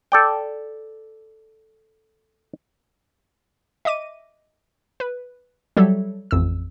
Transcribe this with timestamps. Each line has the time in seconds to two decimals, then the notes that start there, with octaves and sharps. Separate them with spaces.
0.12 A4 D5 G5
3.85 D#5 E5 D6 D#7
5.00 B4
5.77 F#3 G3 A4 C#5 E5
6.31 A1 F2 E6